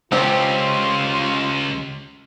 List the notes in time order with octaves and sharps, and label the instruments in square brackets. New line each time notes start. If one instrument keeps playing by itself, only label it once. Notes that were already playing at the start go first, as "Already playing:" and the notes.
[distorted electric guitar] C#2 [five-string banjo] C4 G4 [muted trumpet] F4